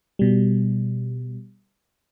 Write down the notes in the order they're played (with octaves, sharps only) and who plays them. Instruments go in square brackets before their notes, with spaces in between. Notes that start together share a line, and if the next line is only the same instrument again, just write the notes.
[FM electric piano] B2 G3